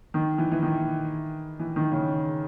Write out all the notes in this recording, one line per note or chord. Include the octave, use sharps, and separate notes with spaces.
D#3
E3
E3
D#3
E3
D#3
C#3